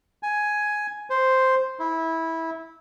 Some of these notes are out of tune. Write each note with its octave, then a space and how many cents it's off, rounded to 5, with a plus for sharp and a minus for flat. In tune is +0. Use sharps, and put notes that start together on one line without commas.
G#5 +10
C5 +0
E4 -15